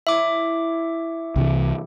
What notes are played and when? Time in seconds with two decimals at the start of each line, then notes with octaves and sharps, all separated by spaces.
0.07 E4 C#5 E5 D6
1.36 C2 C3 E3 G4